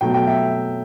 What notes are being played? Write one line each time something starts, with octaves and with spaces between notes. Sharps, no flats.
B2 F#3 A3 G5
G5
E5